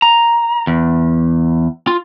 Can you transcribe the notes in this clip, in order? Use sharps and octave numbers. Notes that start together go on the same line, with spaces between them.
A#5
E2
F4